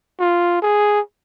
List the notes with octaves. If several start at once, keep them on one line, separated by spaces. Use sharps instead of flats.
F4
G#4